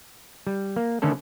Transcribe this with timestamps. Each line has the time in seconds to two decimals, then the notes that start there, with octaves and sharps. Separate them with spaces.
0.47 G3
0.76 A#3
1.02 D3 D#3 A3 C#4 A4